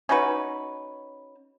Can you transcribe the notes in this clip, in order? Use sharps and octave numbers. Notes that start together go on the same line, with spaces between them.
C#4 D#4 F#4 B4